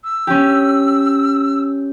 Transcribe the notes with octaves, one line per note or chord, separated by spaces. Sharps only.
E6
C#4 G4